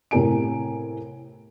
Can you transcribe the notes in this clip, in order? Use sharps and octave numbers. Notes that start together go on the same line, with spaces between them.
A2 C3 G4 A#4 G#5 D7